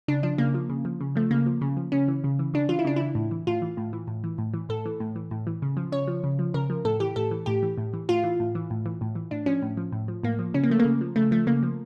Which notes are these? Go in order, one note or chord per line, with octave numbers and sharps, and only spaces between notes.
C#3 D4
F3 D4
C#3 A#3
F3
C#3
F3
C#3
F3 A3
C#3 A#3
F3
C#3
F3
C#3 C#4
E3
C#3
E3
C#3 D4
E3 F4
E4
C#3 D4
E3 E4
A2
E3
A2 F4
E3
A2
E3
A2
E3
A2
E3
A2 A4
E3
A2
E3
A2
E3
C#3
F3
C#3 C#5
F3
C#3
F3
C#3 A#4
F3
A2 A4
E3 G4
A2 A4
E3
A2 G4
E3
A2
E3
A2 F4
E3
A2
E3
A2
E3
A2
E3
A2 D4
F3 C#4
A2
F3
A2
F3
A2 A#3
F3
C#3 C#4
A#3
F3 A3
A#3
C#3
F3
C#3 A3
F3 A3
C#3 A#3
F3